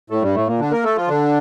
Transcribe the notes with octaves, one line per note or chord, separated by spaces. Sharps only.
A2 A3
G2 G3
A2 A3
A#2 A#3
D3 D4
A#3 A#4
A3 A4
F3 F4
D3 D4